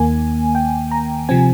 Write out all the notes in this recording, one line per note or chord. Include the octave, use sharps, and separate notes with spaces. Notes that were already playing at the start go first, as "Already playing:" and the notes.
Already playing: D#2 D#3 A#3 G#5
G5
A#5
C3 F3 C4 G#5